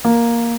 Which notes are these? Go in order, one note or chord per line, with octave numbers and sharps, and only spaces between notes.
A#3